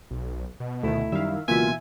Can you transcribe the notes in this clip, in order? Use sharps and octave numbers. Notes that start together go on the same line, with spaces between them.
B1
B2
D2 D#3 A3 E4
F#2 D#3 G3 E5 F5
C#2 B2 E3 A#3 B3 F4 E5 G#5